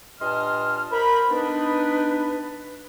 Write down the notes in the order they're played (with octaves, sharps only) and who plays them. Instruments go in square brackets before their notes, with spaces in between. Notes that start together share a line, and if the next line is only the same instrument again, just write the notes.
[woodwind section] G2 A#2 D#5 A5 C6 F6
A#4 C5 B5
B3 D4 D#4 B4